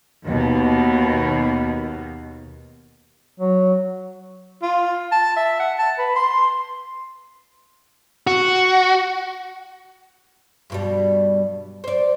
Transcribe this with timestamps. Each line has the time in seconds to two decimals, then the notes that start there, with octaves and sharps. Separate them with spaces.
0.24 D#2 B2
3.40 F#3
4.62 F4
5.12 A5
5.37 E5
5.60 F#5
5.79 A5
5.98 B4
6.16 C6
8.27 F#4
10.70 G2 B2 G3
11.84 C5 D5